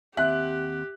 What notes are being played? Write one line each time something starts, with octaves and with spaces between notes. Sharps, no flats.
D#2 C4 G4 E5 F#5 F#6